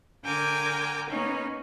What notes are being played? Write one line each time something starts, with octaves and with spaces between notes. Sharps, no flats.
D3 A#4 G5 G#5 D6 G#6
A#3 B3 C#4 D#4